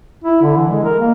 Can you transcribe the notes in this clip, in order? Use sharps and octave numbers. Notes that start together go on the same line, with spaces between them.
E4
D3
E3
G#3
A#4
A#3